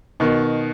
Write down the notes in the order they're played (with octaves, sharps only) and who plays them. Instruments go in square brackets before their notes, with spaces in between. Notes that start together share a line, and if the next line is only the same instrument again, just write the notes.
[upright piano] B2 D#3